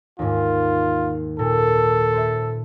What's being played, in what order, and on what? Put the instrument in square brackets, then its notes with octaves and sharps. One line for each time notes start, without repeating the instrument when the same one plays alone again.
[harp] D#2 G#2 [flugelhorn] F4
[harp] A#2 [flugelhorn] A4
[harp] C5 E5